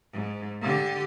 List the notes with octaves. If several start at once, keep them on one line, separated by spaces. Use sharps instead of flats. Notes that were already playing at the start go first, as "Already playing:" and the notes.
G#2
D3 G4